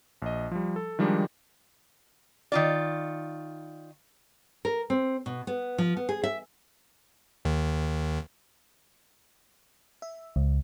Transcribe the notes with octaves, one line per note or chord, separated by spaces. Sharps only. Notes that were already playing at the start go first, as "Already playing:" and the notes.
A#1 D#5
F3 G3
A4
D#3 F3 G3 G#3 D4 D#4
D#3 F4 D5
A#4
C4
B2
B3
F3
B3
G#4
E5
D#2 D#3
E5
C#2